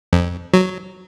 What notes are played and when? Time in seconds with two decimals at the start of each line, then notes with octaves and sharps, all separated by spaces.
0.13 F2
0.54 F#3